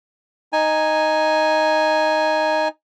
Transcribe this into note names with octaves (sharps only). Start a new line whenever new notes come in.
D#4 G#5